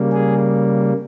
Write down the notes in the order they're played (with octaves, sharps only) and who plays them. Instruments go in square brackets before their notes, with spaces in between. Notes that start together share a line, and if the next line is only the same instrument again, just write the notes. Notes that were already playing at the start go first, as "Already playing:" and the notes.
Already playing: [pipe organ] C#3 G3 A#3
G#4